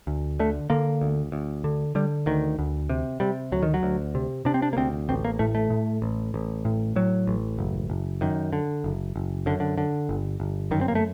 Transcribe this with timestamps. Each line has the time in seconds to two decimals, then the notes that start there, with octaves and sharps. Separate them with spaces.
0.07 D2
0.39 D3 A3
0.70 D3 A#3
1.01 D2
1.32 D2
1.64 D3
1.95 D3 G3
2.26 D2 D#3
2.59 D2
2.89 C3
3.20 C3 G3
3.52 D2 F#3
3.62 D#3
3.74 F#3
3.83 D2
4.15 C3
4.45 C3 D4
4.54 C4
4.62 D4
4.73 A#3
4.77 D2 C4
5.09 A1 C4
5.25 A#3
5.39 A2 A3
5.55 A3
5.70 A2
6.02 A1
6.34 A1
6.65 A2
6.96 A2 F#3
7.27 A1
7.59 F#1
7.90 F#1
8.21 F#2 D#3
8.53 D3
8.84 F#1
9.16 F#1
9.46 F#2 D3
9.60 D3
9.78 D3
10.09 G1
10.40 G1
10.71 F#2 D#3
10.81 C4
10.88 A#3
10.95 A3